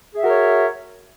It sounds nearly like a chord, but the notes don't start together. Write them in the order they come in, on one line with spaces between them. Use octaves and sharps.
G#4 E5 F#4 A#4 C#5